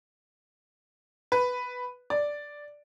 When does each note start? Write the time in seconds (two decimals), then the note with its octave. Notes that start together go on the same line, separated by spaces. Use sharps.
1.32 B4
2.10 D5